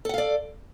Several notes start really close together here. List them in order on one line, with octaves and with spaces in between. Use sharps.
A4 F#5 F5 D5